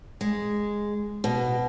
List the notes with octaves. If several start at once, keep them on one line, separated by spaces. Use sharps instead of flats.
G#3
B2